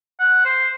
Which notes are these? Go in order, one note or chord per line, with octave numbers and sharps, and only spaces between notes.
F#5
C5